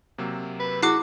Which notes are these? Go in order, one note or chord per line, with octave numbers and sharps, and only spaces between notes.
C3 F#3 A#3
B4
E4 F#4 G#4 D6 F#6 C7